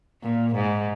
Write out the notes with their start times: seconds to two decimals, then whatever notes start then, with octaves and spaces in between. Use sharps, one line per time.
0.23 A#2
0.55 G#2